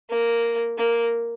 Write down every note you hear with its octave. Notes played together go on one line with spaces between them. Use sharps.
A#3
A#3